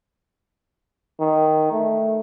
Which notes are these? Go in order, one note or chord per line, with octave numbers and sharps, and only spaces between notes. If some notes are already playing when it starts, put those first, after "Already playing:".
D#3
A3